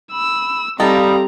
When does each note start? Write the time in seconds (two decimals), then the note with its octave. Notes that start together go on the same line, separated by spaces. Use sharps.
0.12 B5 E6
0.80 G3 C4 D#4 A4 F5 A#5 B5 D#6